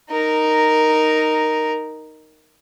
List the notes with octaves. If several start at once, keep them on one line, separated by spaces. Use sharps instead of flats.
D#4 A#4